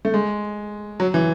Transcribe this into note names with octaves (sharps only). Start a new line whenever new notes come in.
A3
G#3
F#3
E3